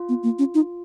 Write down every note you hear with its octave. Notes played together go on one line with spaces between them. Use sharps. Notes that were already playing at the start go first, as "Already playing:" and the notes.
Already playing: F4
B3
A#3
C#4
D#4